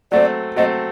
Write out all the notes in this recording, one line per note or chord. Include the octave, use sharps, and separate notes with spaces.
F#3 A3 C4 D5
F#3 A3 C4 D#5